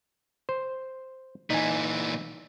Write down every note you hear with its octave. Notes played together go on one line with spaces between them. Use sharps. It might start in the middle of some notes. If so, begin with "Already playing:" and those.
C5
A#2 E3 D#4 G#5